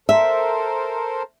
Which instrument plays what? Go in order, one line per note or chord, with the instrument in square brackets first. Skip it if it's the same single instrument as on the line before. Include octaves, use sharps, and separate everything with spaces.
[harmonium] A4 A#4 C5 [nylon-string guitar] E5